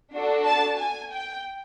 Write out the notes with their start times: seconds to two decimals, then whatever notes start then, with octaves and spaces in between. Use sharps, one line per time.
0.12 D4 F#4 A4
0.46 A5
0.79 G#5
1.13 G5